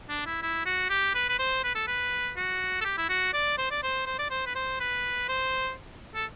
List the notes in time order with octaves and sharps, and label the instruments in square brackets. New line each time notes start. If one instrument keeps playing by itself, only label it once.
[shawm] D4
E4
E4
F#4
G4
B4
B4
C5
B4
A4
B4
F#4
A4
G4
E4
F#4
D5
C5
D5
C5
C5
D5
C5
B4
C5
B4
C5
A4